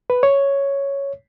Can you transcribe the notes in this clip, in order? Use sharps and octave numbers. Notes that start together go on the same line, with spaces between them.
B4
C#5